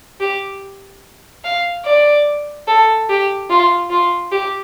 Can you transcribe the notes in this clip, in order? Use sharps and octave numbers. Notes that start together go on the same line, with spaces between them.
G4
F5
D5
A4
G4
F4
F4
G4